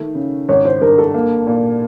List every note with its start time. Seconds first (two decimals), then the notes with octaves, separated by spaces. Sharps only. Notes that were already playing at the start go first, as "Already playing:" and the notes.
Already playing: D#3 A3
0.15 C#3
0.49 G#1 C#5
0.65 C5
0.81 G2 A#4
0.98 A4
1.14 A#3
1.47 A#2